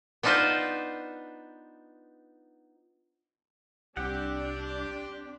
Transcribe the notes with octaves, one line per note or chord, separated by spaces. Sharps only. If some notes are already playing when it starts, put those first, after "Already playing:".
B3 D4 D#4 F4 B4 C5
C2 C4 D4 G4 F#5